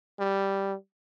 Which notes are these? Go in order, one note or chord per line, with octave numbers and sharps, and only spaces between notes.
G3